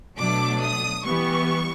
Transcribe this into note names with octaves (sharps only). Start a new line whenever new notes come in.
B2 F#3 A3 D4 D6
D#6
E3 G3 B3 C#6